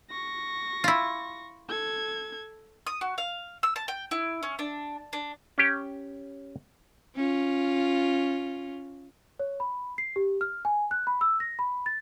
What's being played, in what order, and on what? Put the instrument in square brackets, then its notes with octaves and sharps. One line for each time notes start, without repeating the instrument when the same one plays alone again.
[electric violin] C#6 A#6
[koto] E4 F4
[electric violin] A4 G#6
[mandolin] D#6
F#4
F5
E6
A5
G5
E4
C#4
D4
D4
[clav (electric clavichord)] C#4 G4
[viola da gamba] C#4 F4
[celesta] C#5
B5
C7
G4
F6
G#5
F#6
B5
E6
A#6
B5
A6